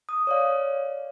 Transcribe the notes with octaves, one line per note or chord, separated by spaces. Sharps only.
D#6
C#5 D5 F5